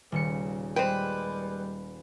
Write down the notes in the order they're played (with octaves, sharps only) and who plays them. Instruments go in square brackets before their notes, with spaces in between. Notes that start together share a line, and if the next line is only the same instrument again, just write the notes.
[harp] D#1 C#7 [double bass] C#3
[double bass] G3 G#3 [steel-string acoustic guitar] B4 [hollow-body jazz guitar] C5 G5